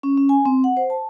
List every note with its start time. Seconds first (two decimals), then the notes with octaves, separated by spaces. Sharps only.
0.03 C#4
0.18 C#4
0.29 G#5
0.46 C4
0.64 F#5
0.77 C5
0.90 A5